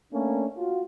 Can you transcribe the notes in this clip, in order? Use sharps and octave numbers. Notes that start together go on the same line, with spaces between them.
A3 A#3 C#4 D4
F4 F#4